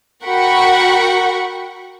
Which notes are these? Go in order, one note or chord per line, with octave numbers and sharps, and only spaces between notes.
F#4 A#4 F#5 G5 B5 C#6